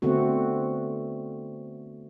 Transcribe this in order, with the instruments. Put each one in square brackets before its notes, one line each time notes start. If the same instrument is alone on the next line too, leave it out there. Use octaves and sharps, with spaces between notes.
[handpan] D3 A3 B3 C4 F#4